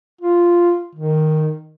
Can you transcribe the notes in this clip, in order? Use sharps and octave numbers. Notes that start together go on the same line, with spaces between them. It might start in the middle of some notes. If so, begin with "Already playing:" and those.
F4
D#3